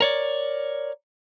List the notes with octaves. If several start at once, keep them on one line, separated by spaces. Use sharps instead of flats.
A#4 C#5 D5